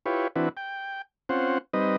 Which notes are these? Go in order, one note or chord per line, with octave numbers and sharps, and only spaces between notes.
E4 F4 G4 B4 C#5
E3 C4 D4 E4 F#4 B4
G5
C4 C#4 F4 C5 F#5
G3 C4 D#4 B4 D#5